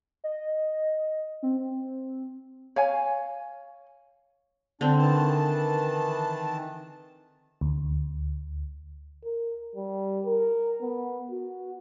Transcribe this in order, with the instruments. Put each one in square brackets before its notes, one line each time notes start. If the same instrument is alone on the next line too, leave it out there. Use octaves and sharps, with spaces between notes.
[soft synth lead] D#5
C4
[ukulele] C#5 F5 G#5
[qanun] D3 C4 [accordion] D4
[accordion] D#3 E3 A5
[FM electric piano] D2
[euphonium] A#4
G3
A#4
B3
F#4